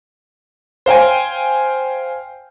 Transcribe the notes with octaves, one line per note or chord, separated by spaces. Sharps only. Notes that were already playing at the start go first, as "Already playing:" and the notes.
C5 F5 G5 G#5